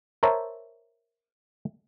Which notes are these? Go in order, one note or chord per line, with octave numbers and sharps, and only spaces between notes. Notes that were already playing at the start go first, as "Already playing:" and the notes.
A#4 C5 C#5 E5 A5 A#5